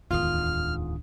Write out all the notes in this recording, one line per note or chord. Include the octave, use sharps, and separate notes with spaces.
D1 E2 G#2 D#3 D4 F4 D#6 F6